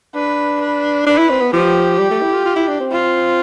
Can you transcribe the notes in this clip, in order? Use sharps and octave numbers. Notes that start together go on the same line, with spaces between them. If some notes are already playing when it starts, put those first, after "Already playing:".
D4 B4
B4
D4 B4
E4
C4
B3
F3 G4
G3
A3
E4
F4
F4
E4
D4
C4
F4